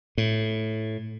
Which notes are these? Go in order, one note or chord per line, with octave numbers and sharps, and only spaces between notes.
A2